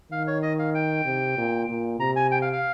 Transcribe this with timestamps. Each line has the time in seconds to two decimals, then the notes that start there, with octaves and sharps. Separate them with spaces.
0.11 D#3 F5
0.27 C#5
0.42 D#5
0.59 F5
0.75 G5
1.05 C3
1.37 A#2
1.68 A#2
1.99 C3 A#5
2.16 G#5
2.31 G5
2.42 F5
2.53 F5